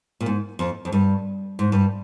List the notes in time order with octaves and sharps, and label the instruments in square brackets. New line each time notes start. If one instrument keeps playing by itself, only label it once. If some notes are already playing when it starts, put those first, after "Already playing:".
[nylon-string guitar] A#2
G#2
F2
F2
G2
G#2
G2